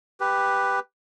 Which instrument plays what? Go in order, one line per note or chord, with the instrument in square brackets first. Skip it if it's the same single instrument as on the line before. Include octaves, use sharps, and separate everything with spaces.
[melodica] G4 B4